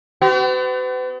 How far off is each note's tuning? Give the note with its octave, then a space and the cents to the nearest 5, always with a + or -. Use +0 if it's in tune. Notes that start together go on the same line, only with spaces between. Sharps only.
B3 +45 F#4 +40